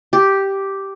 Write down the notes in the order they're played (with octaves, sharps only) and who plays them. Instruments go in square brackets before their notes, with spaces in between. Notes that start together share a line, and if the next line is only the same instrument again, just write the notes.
[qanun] G4